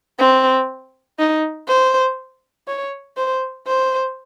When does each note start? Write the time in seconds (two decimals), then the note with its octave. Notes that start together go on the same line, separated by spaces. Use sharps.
0.19 C4
1.19 D#4
1.68 C5
2.67 C#5
3.17 C5
3.67 C5